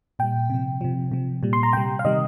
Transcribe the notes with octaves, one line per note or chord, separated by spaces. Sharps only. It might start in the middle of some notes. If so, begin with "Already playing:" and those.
A#2 G3 G5
C3 F3
C3 F3
C3 F3
A#2 G3
C6
A#5
C3 G3 G5
F5
C3 D#3 G3 D#5